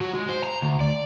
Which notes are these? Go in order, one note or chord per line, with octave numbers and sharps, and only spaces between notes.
F#3 F#4
G#3
C5
A#5
D2
D5